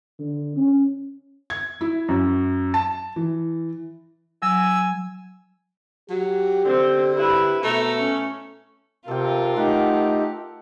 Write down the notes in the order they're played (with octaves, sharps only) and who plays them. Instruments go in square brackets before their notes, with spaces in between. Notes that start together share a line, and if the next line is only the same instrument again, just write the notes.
[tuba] D3
C#4
[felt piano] G#6
E4
F#2
A5
E3
[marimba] F#3 [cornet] G#5 [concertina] E6
[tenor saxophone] F#3 [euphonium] G4
[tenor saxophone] D3 [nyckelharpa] C4
[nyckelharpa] E4 B4 [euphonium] G4
[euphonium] B2 [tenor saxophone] A3 [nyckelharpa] A#5
[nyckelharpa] C#4
[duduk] C3 [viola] F4 A#4 [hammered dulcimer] A4 G5
[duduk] A3 [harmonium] D#4 G4 [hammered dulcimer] F#5